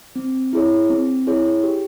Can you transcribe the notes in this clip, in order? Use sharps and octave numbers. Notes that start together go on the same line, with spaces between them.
C4
E4 G#4 C#5
C4
E4 G#4 C#5
G4